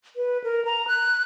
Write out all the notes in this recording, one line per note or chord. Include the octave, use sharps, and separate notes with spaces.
B4
A#4
A#5
F#6